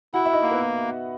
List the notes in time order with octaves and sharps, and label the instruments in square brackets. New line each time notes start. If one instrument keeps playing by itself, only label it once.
[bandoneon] E4 [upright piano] F#4 F#5
[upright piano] E5
D#4 D#5
[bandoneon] A#3
[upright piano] B3 B4